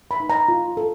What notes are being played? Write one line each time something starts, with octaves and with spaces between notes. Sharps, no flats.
B5
D#4
A#5
F4
A4